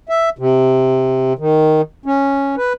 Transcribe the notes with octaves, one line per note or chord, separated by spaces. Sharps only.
E5
C3
D#3
C#4
B4